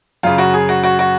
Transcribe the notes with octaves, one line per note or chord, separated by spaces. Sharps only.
F#2 C#3 F4
F#4
G#4
F#4
F#4
F#4